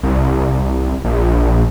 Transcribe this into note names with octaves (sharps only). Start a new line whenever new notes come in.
C2
A#1